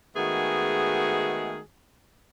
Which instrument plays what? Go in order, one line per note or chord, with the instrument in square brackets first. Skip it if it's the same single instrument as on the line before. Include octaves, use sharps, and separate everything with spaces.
[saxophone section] D#3 G#3 A3 B3 F#4 G#4